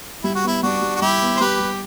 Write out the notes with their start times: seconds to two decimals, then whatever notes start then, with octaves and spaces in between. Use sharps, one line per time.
0.24 G3 E4
0.35 F#4
0.44 B3 E4
0.63 G3 D4 F#4
0.82 G3
0.96 F#4
1.02 G3 E4 G4
1.21 B3
1.37 C5
1.40 G3 G4 B4
1.59 G3